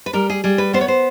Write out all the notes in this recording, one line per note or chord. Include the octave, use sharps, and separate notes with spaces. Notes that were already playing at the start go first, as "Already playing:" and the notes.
B4
G3 A#4
G#4
G3 G#4
B4
B3 C5
C#5
C5